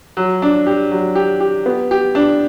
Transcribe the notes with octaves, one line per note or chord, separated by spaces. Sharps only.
F#3
D4
G4
F#3
G4
G4
B3
G4
D4